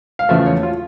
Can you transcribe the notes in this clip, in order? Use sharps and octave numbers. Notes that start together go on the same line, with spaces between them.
F5
E2 C#3 F3 A3 E5
C#5
F4